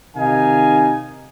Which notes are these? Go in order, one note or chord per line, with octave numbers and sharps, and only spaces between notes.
C3 D#3 D#4 F5 G#5